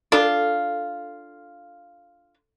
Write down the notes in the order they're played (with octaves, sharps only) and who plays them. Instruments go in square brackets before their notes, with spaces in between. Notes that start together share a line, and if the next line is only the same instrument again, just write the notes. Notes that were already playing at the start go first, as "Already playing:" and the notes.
[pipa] D4 F4 [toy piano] A4